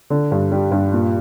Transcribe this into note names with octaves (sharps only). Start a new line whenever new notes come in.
D3
G2
G3
G2
A#2